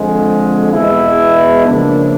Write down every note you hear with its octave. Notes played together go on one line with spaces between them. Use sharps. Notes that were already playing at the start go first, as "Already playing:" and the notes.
Already playing: F2 D3 F3 G#3
E2 B2 G#3 B3 E4
C#3 F3 A#3 D4